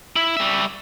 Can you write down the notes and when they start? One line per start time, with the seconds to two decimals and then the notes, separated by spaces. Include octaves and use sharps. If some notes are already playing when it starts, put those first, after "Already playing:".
0.16 E4
0.37 G3 E5